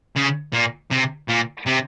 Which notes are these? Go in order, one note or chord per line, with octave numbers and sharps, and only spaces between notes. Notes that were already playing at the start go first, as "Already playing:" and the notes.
C#3
A#2
C3
A#2
C3